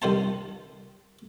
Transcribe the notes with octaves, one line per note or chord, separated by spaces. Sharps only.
C2 D#3 C5 A5